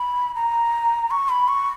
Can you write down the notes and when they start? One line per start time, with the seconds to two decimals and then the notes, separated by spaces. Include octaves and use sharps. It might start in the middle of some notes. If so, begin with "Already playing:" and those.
Already playing: B5
0.35 A#5
1.11 C#6
1.29 B5
1.48 C#6